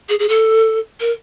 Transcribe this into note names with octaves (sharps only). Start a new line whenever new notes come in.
G#4
G#4
A4
A#4